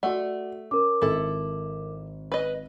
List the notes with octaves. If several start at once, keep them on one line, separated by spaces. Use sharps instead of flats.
A3 F#4 D5 F#5
C#4 A#4 D6
G#1 E4 A4
B4 D#5